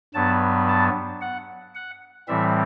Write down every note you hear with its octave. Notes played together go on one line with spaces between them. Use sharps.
G2 F#3 B3 A5
A5
F#5
F#5
A2 E3 G3 C4 E5